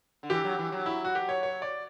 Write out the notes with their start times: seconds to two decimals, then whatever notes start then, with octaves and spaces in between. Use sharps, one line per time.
0.23 D3
0.30 E3 G4
0.44 F#3
0.59 E3
0.72 F#3
0.86 E4
1.05 F#4
1.15 G4
1.29 C#5
1.43 C#5
1.62 D5